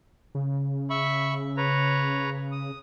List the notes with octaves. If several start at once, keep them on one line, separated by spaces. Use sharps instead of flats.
C#3
E5 B5 C#6
B4 C#5 A#5
D#6